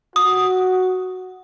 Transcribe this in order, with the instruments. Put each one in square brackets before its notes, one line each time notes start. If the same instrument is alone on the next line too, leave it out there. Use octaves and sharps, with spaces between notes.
[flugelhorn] F#4 [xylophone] D#6